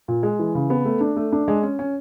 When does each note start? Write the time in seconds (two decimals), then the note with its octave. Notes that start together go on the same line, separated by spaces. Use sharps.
0.08 A#2
0.23 G#3
0.39 E3
0.55 C#3
0.70 B3
0.85 A3
1.01 D4
1.16 A3
1.32 D4
1.48 G#3
1.63 C#4
1.79 C#4